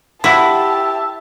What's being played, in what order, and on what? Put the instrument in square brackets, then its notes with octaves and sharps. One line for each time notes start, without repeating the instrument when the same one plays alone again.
[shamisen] C4 F#4 [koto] E4 [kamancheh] G4 A5 [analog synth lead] E5